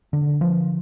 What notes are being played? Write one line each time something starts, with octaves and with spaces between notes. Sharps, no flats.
D3
F3